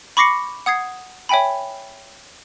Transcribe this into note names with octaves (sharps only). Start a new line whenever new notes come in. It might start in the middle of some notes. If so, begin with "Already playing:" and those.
B5 C#6 D6 A#6 C7 C#7
F#5 D#6 G#6 C7
C#5 E5 G5 G#5 B5